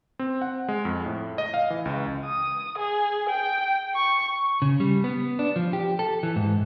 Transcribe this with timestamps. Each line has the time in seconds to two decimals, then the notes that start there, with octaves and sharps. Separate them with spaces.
0.19 C4
0.42 F#5
0.68 G#3
0.85 F2
1.06 A2
1.38 D#5
1.54 F5
1.70 E3
1.85 C#2
2.25 D#6
2.78 G#4
3.29 G5
3.95 C#6
4.62 C#3
4.80 G3
5.04 B3
5.39 D4
5.56 F3
5.73 G4
5.99 A4
6.23 E3
6.36 G#2